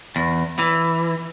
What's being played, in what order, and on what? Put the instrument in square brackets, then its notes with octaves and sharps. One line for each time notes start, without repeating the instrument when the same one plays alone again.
[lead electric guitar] E2
E3